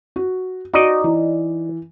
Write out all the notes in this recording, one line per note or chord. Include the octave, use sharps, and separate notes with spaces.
F#4
D#4 F#4 D5 D#5
E3